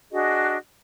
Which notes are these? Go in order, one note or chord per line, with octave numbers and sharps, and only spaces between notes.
D4 F#4 G#4 D#5